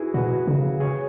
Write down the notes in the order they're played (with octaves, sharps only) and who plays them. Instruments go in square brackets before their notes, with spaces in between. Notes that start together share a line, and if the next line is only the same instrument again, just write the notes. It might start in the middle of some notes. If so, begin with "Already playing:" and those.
Already playing: [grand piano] E4 F#4 G#4 B4
[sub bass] B2 [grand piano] F#4 B4
[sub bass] C#3
[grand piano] G#4 C#5